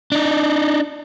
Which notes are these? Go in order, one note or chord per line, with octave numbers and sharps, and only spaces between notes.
D4 D#4